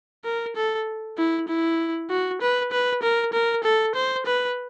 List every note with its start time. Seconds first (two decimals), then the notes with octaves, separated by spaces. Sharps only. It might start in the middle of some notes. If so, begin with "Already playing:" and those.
0.25 A#4
0.56 A4
1.17 E4
1.48 E4
2.10 F#4
2.41 B4
2.72 B4
3.02 A#4
3.33 A#4
3.64 A4
3.95 C5
4.26 B4